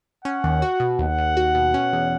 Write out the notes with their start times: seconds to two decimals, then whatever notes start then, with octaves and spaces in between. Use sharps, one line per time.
0.25 C#4 F#5
0.44 D#2
0.62 F#4
0.80 B2
0.99 D#2 F#5
1.18 D#2
1.37 F#4
1.55 B2
1.74 C#4
1.93 E2